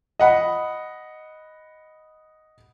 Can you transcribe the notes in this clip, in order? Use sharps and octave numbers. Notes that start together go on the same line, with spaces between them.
D#5 F#5 B5